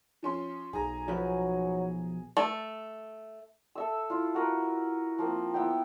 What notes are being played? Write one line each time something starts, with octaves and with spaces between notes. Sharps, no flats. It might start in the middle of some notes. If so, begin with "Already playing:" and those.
F3 C#4 C6
B1 G#4 A#5
F3 F#3 B4
A3
A4 E5 E6
E4 F4
F#4 A#4 B4
F3 A#3 C4
B3 E4 G5